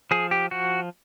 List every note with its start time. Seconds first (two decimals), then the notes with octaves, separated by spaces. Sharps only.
0.11 F3 G#4
0.31 G4
0.51 F3 F#4